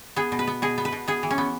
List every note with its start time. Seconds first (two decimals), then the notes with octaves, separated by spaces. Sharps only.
0.16 B3 G#4
0.32 B2
0.39 B4
0.47 B3
0.62 B2 G#4
0.78 B3
0.85 B4
0.92 B2
1.08 B3 G#4
1.23 E3
1.31 C#4
1.38 B3